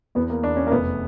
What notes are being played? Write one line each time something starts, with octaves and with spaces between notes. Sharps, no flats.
E2 B3
A#3
E2 D4
C#4
A#3
F1 B3